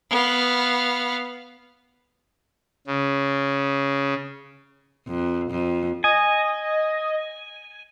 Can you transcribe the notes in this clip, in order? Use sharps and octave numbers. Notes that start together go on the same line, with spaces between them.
B3 F5
C#3
F2
F2
D#5 G#5